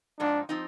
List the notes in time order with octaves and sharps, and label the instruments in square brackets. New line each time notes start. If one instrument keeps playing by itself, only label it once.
[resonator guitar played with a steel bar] G#2 F3 C4 D#4 [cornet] D4
[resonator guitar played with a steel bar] F3 C4 D#4